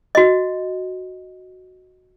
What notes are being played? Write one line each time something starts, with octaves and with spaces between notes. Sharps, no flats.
F#4 D#5